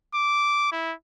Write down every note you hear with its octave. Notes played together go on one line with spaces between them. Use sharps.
D6
E4